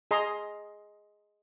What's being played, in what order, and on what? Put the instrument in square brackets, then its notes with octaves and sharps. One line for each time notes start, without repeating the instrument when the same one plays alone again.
[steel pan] G#4 D#5 A#5 C6